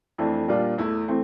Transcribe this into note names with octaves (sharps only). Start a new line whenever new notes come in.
F2 E3 A3 D4
A#2 G3 A#3 D4 F4
E2 E3 A3 E4
E3 A3 C4